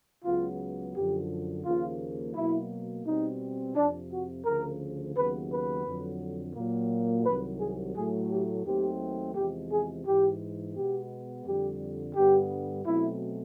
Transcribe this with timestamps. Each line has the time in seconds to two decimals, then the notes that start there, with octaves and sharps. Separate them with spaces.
0.24 C#2 C#3 F#3 B3 F4
0.95 F#2 D3 F3 G4
1.64 D#2 C#3 F3 A#3 F4
2.34 B2 F#3 A#3 E4
3.04 B2 G3 C4 D#4
3.75 F2 C3 F3 D4
4.10 F#4
4.44 D2 C#3 F3 A#4
5.15 D#2 C#3 F#3 B3 B4
5.50 B4
5.85 F2 D3 F#3
6.55 A#2 F#3 A#3
7.24 C2 C3 D#3 F#3 B4
7.59 G#4
7.95 A2 F#3 A3 G#4
8.29 G4
8.64 D#2 D#3 F#3 A3 C4 G4
9.35 E2 C3 F3 G#3 G4
9.70 G#4
10.05 G#2 E3 G#3 G4
10.74 B2 G#3 B3 G4
11.44 F2 D3 G3 G4
12.14 G2 D3 G3 B3 G4
12.84 B2 F#3 A3 C4 E4